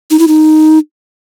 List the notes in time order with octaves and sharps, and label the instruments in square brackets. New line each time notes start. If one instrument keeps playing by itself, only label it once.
[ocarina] D#4
E4
D#4